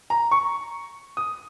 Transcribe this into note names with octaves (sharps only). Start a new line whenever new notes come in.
A#5
C#6
D#6